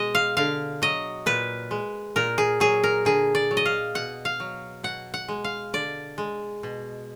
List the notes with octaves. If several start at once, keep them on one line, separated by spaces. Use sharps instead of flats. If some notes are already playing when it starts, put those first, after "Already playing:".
Already playing: B2 G#3 G#4 D#5
F5
D3 F5
F#3 D#5
A#2 B4
G#3
A#2 A#4
G#4
F#3 G#4
A#4
D3 G#4
D5
F#3
D#5
F5
B2 F#5
F5
F#3
B2 F#5
F#5
G#3
F5
D3 D5
G#3
B2